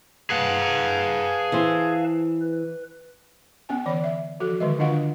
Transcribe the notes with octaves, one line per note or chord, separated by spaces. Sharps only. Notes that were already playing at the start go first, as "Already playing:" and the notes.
G#4 B4 F5 F#5 A5
E3 C5
B4
B3 C#4 G#5
D3 E3 D5 B5
E5
E3 F3 F#4 A4
D3 D#3 G#3 D#5
D3 D4 F4 D#5 F5 F#5